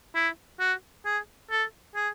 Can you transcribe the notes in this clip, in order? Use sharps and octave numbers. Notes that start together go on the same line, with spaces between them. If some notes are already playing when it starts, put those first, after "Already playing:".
E4
F#4
G#4
A4
G#4